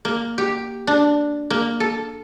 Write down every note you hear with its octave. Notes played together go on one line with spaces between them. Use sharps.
A#3
G4
D4
A#3
A4